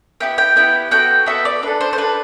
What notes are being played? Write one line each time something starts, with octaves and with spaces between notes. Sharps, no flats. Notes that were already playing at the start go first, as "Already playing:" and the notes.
B3 E4 G4 G5
G5
B3 E4 G4 G5
B3 F#4 A4 G5
B3 F#4 A4 E5
D5
D4 A4 B4
C5
C5
D4 A4 B4